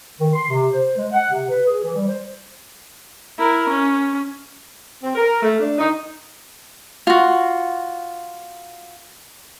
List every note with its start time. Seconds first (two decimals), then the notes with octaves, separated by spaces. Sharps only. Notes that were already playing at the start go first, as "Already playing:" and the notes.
0.20 D#3
0.33 C6
0.50 C3
0.72 C5
0.97 G#3
1.12 F#5
1.30 C3
1.49 B4
1.65 G#4
1.83 E3
1.95 G3
2.08 C5
3.38 E4 A#4
3.70 C#4
5.03 C4
5.16 A#4
5.43 A3
5.60 D4
5.79 D#4
7.07 F4 F#4